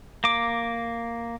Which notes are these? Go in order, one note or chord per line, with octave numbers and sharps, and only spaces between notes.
A#3 D6